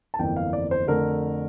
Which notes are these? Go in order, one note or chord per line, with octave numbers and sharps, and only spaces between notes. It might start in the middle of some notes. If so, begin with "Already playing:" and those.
A5
G1 F2 E3 A#3 G5
F5
D5
C5
F2 D3 A3 A#4